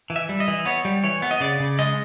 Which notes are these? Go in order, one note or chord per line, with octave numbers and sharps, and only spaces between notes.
E3
E5
G3
D#5
E3
B3 C#5
G3
E3 C#5
B3
D#5
C#3 D5
C#3
G#3 D#5